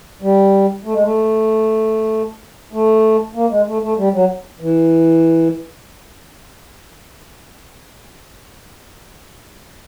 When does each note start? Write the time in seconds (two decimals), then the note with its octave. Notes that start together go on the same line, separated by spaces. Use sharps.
0.22 G3
0.85 A3
0.94 G#3
1.04 A3
2.73 A3
3.35 A#3
3.51 G#3
3.67 A3
3.83 A3
3.98 G3
4.14 F#3
4.61 E3